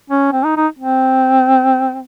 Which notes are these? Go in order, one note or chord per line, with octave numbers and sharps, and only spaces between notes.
C#4
C4
D#4
D#4
C4